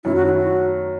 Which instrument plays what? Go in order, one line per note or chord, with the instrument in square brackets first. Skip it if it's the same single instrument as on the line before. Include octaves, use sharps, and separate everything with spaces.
[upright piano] F#2 D#3 F#3 A3 [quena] E4
[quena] F#4
E4
F#4